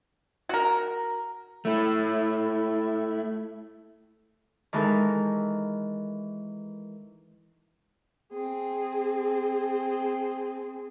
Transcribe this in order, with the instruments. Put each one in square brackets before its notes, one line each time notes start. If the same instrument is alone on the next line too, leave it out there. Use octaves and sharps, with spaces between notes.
[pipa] F#4 A#4
[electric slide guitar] A3 E4
[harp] D#3 E3 G#3 A4 A#4
[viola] C4 G#4